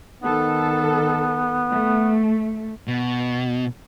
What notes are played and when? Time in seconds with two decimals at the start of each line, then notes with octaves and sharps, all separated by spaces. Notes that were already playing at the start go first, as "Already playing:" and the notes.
0.22 D#3 B3 A4
1.70 A3
2.88 B2